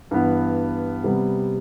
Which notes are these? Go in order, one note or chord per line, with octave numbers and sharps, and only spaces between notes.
G2 E3 B3
C3 G3 B3